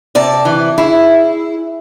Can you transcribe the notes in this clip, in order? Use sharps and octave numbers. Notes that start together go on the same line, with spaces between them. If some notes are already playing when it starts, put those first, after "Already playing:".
C3 D5 A5
E3
E4 G#4